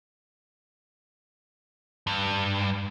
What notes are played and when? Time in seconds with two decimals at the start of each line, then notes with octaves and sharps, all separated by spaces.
2.07 G2